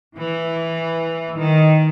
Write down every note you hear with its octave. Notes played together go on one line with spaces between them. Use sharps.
E3
D#3